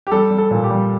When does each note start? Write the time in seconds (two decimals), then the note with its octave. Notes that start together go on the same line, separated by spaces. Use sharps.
0.07 G4
0.11 G3 A4
0.31 G3
0.38 A4
0.51 A#2
0.64 G4
0.70 G3